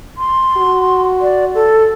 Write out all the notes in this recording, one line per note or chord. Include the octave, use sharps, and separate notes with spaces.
C6
F#4
D5
A4